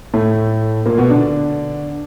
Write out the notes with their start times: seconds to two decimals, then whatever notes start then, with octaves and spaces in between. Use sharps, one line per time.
0.14 A2 A3
0.86 A#2 A#3
0.98 B2 B3
1.10 D3 D4